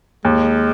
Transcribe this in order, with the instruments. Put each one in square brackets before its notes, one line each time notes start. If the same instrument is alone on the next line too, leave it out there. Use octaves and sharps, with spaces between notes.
[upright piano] D#2 [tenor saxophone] G#3